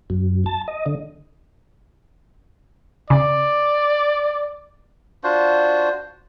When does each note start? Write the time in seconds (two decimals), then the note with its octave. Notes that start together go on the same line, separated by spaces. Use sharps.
0.10 F#2
0.46 A5
0.68 D#5
0.86 D3
3.10 C#3 D5
5.23 D4 F4 F#4 C5